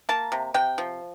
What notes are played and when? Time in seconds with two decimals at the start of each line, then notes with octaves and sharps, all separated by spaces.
0.09 A#3 A5
0.32 C3
0.54 C3 G5
0.78 F3